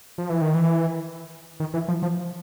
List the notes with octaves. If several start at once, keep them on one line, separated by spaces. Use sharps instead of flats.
F3
E3
D#3
E3
D#3
E3
F3
F3